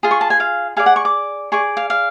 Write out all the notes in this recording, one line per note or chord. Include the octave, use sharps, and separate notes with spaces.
F4 G#4
C#6
A5
G#5
F5
G#4 D5 F5
F#5
C#6
D6
G#4 D5 C#6
F5
F5